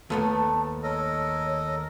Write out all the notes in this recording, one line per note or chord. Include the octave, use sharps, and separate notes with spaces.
D#2 A3 B3 A5
A4 A#4 C#5 D#5